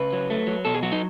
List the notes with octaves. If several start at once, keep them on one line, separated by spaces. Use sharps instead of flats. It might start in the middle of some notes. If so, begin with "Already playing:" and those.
Already playing: C#3 B4
F#3
A3
F#3
B2 A4
G#4
F#3 F#4
D#4